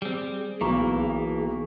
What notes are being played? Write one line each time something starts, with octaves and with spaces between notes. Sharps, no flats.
G3 C4 G#4
B1 E3 A#3 A#5 C#6 D6